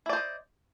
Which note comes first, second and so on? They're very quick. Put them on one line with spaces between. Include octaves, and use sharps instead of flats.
E4 D5 C5 D#5